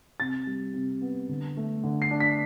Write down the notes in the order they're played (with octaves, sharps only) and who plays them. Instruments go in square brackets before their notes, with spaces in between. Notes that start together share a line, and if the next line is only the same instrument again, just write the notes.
[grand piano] C3 A6
G3
C3
B3
D3
A3
D3
C7
D4
B6